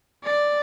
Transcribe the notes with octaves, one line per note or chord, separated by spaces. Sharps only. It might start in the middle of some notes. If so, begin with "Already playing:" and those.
D5